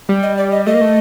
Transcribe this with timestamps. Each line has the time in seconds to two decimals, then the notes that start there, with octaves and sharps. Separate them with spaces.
0.09 G3
0.23 D#5
0.38 D5
0.52 D#5
0.66 A3 D#5
0.74 A#3
0.81 A3